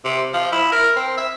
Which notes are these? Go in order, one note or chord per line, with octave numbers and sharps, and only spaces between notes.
C3
F3
E4
A#4
C4
E5